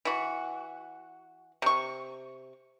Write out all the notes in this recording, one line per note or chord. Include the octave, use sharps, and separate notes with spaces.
E3 F#4
C3 C#6